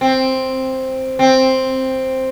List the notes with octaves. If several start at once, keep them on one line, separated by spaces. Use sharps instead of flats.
C4
C4